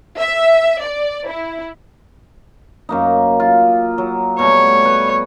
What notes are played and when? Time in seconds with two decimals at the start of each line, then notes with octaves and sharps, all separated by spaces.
0.20 E5
0.82 D5
1.28 E4
2.89 F#2 A#3 D#4
3.40 F4
3.98 F#3
4.39 B2 G3 A3 C#5
4.85 B4